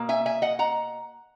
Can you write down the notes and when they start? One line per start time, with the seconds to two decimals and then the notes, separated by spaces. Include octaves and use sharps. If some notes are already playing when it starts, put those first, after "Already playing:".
Already playing: B2 A#3
0.09 E5 G#5
0.26 E5 G#5
0.42 D#5 F#5
0.59 F#5 A#5